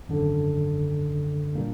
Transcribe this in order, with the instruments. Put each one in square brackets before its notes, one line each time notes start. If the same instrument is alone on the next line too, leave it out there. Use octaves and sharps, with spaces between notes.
[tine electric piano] G#1 F#2 D3
A#2 G3 A#3 D4